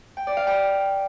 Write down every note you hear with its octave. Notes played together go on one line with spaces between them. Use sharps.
G5
D5
F5
G5